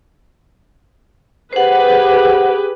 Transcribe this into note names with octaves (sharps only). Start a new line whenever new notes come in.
G4 G#4 B4 C5 F#5